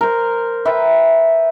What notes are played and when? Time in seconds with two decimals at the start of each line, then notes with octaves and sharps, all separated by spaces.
0.01 A#4 C5
0.65 B4 E5 G5